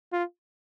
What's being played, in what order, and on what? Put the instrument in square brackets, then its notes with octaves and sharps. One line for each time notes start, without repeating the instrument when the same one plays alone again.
[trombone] F4